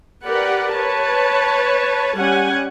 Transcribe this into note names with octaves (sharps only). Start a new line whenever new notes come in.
G4 A#4 B4 D5 F#5
B4 C#5 A5
G3 C#4 G4 F#5 G#5